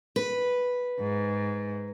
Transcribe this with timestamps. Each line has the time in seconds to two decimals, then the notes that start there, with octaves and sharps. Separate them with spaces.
0.16 B4
1.00 G#2